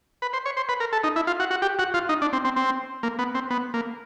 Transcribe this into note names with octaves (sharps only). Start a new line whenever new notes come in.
B4
C5
C#5
C5
B4
A#4
A4
D#4
E4
F4
F#4
F#4
G4
F#4
F4
D#4
D4
C4
C4
C4
A#3
B3
C4
B3
A#3